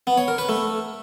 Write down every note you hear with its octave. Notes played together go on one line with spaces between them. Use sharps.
B3
C#5
A#4
B4
A3